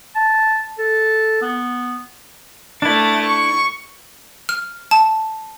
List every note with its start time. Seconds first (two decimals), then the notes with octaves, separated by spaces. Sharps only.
0.15 A5
0.79 A4
1.42 B3
2.82 A3 D4 E4 A6
3.25 C#6
4.49 F6
4.91 A5